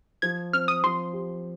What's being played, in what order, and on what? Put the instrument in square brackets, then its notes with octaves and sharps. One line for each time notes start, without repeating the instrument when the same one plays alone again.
[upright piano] F3 [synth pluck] G#6
[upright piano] C4 [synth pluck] F6
[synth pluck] D#6
[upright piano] F3 [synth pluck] C6
[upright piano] G4